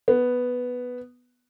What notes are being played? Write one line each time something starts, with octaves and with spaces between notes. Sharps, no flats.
B3